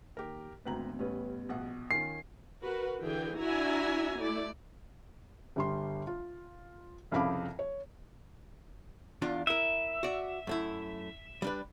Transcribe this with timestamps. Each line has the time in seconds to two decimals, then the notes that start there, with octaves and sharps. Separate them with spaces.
0.17 D#2 G4 A#4
0.65 G#1 D2 B3 B4 G5 A#5 F#7
0.99 A1 G3 C#4 B4
1.49 A#1 B2 F#5
1.91 D#3 C#4 F4 G#5 C7
2.62 F#4 A#4 B4
3.01 D3 E3 G#4 G5
3.38 D4 E4 F#4 E5 G#5 A#5
4.19 A3 E4 D5
5.56 G1 G3 C6
6.07 F4
7.12 C2 F2 C#3 F5 B5 D6
7.59 C#5
9.22 E2 D4 F4
9.47 E4 A#4 E5
10.03 F#4 D5
10.47 F#2 A3 E4
11.42 G3 D4 B4